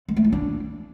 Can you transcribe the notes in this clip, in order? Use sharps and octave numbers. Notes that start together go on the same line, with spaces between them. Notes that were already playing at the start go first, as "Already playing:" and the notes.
G#3
A3
E4
D4